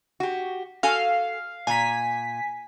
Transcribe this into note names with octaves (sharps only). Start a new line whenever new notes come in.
F#4 G4
F#4 A4 F5 G#5
A#2 G#5 A#5 B6